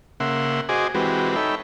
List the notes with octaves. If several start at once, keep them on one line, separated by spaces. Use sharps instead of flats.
C#3 A#3 E5 F#5 C6
F#4 G#4 C5 D#5 G#5 D6
E3 G#3 C4 F#4 G4 B4
D#4 A4 C#5 E5 G5 B5